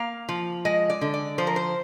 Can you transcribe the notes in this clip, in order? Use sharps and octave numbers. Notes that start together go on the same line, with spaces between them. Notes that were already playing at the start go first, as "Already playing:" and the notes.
Already playing: A#3 F5
F3
G#3 D#5
D5
D3
D5
F3 C5
A#4
C5